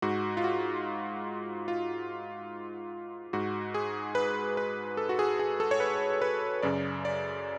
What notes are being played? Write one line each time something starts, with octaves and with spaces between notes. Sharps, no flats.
G#2 F#4
F4
F#4
F4
G#2 F#4
G#4
B4
B4
A4
F#4
G#4
G#4
A4
C#5
B4
B4
F#2 C#3 D5
D5